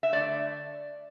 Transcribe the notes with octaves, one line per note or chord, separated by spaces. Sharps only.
E5
D3 A3 D5